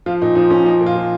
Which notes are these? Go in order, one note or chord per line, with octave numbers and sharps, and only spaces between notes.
F3 F4
A#2 D#4
F3 D#4
A#2 C#4
F3 D#4
A#2
F4
F3